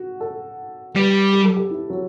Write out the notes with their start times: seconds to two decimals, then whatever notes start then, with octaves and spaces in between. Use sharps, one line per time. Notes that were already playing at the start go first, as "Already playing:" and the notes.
Already playing: F#4
0.20 A4
0.95 G3 B4
1.33 G4
1.44 A4
1.57 G4
1.71 E4
1.90 F#3